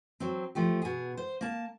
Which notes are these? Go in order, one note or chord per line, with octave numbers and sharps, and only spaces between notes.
F#3 C4
F3 A3 G4
B2 G#4
C5
A#3 A5